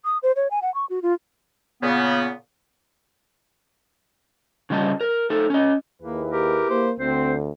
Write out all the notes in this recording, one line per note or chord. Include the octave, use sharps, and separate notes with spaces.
D#6
C5
C#5
G#5
F#5
C#6
F#4
F4
A#2 C#3 B3
C#3 F3 G3 D#5 A5
A#4
A3 D#4 A4
C#4 D#5
D#2 A#3 E4 G#4 B4
G4 A#4
A#3 C5
D2 D3 C4 C5